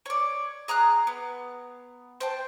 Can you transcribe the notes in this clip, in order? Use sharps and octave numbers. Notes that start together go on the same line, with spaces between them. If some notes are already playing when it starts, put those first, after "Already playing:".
C#5 D5
G#4 A#5 D#6 F#6
B3
C5 G5 A5